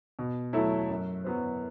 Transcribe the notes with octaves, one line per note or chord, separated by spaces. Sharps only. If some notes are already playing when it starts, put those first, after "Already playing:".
B2
F#3 A3 E4
F#2
F#3 B3 F#4 C5